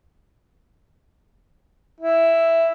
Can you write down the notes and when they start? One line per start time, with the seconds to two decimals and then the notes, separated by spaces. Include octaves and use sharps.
2.01 E4